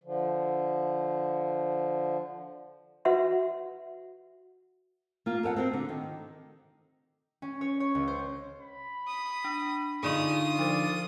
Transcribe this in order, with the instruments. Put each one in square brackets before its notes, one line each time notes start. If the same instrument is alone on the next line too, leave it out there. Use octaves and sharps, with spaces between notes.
[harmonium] D3 F3
[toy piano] F#4 B4 E5 F#5 C6
[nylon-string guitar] A#3 F4
A4 A#4 F5 F#5
C4 F#4 A#4
D3
D#3
[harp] C#4
C#5
C#5
C#2
C5
[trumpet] B5
[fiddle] D#6
[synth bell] D4
[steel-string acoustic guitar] D3 D#4 G#5 [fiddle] F4 D#6 [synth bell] G#4 D5 C#6
[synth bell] F3 C5 [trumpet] D5